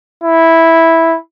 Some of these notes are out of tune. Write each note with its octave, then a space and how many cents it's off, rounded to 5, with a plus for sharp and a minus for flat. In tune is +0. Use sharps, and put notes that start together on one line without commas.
E4 -5